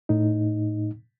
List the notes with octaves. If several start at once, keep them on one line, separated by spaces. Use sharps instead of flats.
A2 D#4